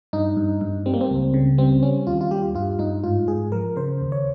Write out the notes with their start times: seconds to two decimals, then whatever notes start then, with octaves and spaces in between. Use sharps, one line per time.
0.13 G2 D#4
0.37 G2
0.61 G2
0.86 G3 C4
0.94 A#3
1.01 C4
1.10 C#2
1.34 C#3
1.58 G3 C4
1.83 G3 C#4
2.07 D#2 F4
2.21 F4
2.31 G3 G4
2.55 G2 F4
2.79 G2 D#4
3.03 G#2 F4
3.28 G#2 G#4
3.52 F3 A#4
3.76 C#3 C5
4.01 D#2
4.12 C#5